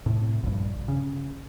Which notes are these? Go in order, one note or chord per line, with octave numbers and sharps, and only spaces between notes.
A2 C3
A#1 G2
C#3